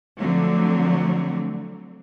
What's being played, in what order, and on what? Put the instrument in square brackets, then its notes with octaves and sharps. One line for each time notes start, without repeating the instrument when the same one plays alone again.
[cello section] D3 F3 F#3 A3 C4